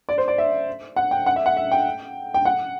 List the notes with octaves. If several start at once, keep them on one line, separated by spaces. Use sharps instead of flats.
D5
C5
D5
E5
F#5
G5
F#5
E5
F#5
E5
G5
G5
F#5